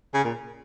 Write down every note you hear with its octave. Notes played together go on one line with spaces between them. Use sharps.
C#3
A#2